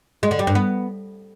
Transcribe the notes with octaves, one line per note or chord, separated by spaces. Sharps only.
G#3
D3
G3
G2
B3